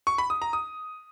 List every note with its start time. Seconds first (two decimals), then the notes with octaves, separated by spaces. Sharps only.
0.07 C#6
0.18 B5
0.30 D#6
0.42 A#5
0.53 D#6